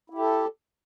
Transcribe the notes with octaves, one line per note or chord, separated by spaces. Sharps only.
E4 G4 A4